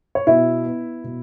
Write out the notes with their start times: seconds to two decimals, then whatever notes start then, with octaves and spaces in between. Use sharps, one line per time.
0.15 C#5
0.27 B2 E4 E5
0.66 B3
1.04 B2